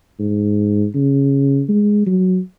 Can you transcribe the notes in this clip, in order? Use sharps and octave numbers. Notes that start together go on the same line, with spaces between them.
G#2
C#3
G#3
F#3